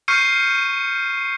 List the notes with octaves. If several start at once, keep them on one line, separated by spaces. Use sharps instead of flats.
C#6 F6 G6 C7 C#7 D#7